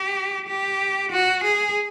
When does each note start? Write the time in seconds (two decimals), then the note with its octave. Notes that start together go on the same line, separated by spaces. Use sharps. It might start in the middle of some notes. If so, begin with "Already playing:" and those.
Already playing: G4
0.48 G4
1.11 F#4
1.44 G#4